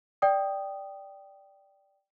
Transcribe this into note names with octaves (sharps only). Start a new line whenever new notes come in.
D5 G5 D#6